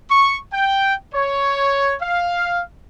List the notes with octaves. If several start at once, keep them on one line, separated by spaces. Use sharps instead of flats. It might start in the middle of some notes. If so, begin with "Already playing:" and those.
C#6
G5
C#5
F5